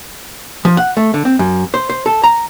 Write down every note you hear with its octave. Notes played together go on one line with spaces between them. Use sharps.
F3
F#5
A3
D3
C4
F#2
C5
C5
A4
A#5